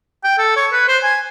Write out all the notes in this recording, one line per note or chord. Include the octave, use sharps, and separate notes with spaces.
G5
A4
C#5
B4
C5
G#5